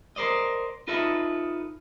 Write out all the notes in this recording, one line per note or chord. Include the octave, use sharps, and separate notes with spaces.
A#4 C5 D5 D#5
D#4 F4 A4 B4 D#5 E5